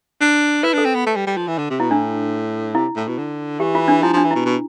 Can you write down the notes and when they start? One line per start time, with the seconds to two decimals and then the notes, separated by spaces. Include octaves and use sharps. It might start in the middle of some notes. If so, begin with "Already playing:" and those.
0.21 D4
0.63 E4 B4
0.73 D4 A4
0.85 C4
0.95 B3
1.06 A3
1.16 G3
1.27 G3
1.37 F3
1.47 E3
1.58 D3
1.70 C3
1.80 B2 E4
1.90 A2 D4
2.75 C3 E4
2.96 A2
3.08 B2
3.18 D3
3.60 E3 G4
3.75 F4
3.88 D4
4.02 F3 E4
4.13 F3 D4
4.24 E3
4.31 B2 E4
4.45 B2